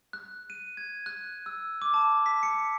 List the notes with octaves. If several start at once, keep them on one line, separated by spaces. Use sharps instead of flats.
F#6
D#7
G#6
F#6
E6
D6
A5
B6
C#7